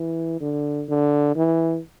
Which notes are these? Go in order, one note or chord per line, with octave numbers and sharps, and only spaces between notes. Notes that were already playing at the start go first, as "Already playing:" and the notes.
Already playing: E3
D3
D3
E3